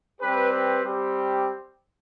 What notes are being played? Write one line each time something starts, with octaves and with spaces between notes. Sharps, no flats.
G3 C4 G4 B4
B4
G3 C4 G4